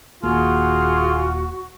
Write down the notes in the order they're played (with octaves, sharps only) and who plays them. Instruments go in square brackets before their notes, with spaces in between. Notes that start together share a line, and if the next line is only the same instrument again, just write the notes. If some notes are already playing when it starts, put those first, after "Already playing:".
[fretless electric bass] D#1 D#2 A#3 [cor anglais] F4 [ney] F#4 [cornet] G#4